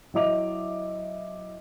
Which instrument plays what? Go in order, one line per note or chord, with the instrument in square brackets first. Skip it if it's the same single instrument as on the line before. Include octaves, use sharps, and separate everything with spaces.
[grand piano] F#3 E4 D#5 E5 D6 F7